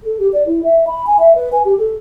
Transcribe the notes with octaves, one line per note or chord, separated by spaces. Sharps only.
A4
G4
D5
E4
E5
B5
G#5
E5
B4
G#5
G4
A4